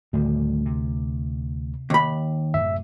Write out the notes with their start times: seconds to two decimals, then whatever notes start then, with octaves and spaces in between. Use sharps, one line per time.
0.13 D2 A2 D#3 G3
0.66 C3
1.90 D#2 B5
2.54 F#2 A2 C3 E5